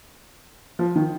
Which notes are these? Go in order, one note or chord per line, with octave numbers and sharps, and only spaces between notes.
F3
D#3